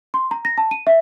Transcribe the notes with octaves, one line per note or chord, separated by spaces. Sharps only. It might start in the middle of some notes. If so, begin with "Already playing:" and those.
C6
A#5
A#6
A5
D#7
E5